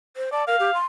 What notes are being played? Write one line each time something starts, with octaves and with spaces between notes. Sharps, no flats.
C5
D5 A5
A#4 F5
G4
C6